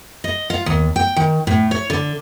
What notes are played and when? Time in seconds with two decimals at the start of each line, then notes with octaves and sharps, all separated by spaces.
0.24 D#5
0.50 F4
0.66 D#2
0.96 G5
1.16 D#3
1.47 A2
1.71 C#5
1.90 D3